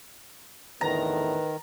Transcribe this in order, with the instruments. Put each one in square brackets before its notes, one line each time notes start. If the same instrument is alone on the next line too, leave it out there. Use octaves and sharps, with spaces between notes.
[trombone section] E2 A2 D3 [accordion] D#3 [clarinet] B4 [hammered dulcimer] A#5